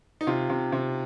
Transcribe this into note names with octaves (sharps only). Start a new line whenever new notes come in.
D#4
C3 F4
C3
C3